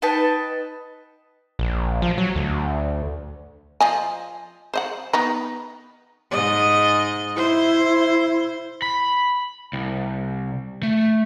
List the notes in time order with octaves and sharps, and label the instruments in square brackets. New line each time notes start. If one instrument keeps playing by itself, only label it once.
[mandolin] D#4 B4 G5 A5
[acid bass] A#1
F3
F#3
D2
[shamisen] F3 D#5 G#5
C5 D#5 F#5
B3 D#4 B4
[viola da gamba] G#2 D#5
[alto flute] E4 [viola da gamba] C5
[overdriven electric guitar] B5
C2
A3